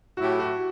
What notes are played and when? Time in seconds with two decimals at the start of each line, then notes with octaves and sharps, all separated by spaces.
0.17 A2 F#3 A3 E4 F#4 G4
0.39 F#4